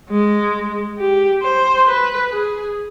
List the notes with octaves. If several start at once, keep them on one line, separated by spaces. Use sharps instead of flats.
G#3
G4
C5
B4
G#4